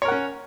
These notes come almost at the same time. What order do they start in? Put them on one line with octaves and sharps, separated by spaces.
C#5 A#4 F#5 C#4